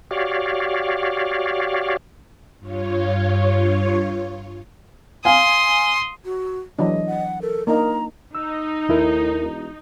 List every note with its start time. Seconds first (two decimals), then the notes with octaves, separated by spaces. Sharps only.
0.11 F#4 G4 C#5 D5 F5
2.59 G2 F4 C#5
5.25 F5 G#5 C6 D#6
6.25 F#4
6.79 E3 F#3 G#3 D4 D#5
7.07 F#5
7.42 A4 A#4
7.67 A#3 D4 D#4 A#4 A#5
8.35 D#4 E6
8.89 D#2 A2 E4 A#4
9.41 E1